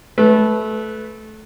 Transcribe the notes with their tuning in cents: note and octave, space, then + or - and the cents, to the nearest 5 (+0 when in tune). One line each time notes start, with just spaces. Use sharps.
A3 -20 B4 +0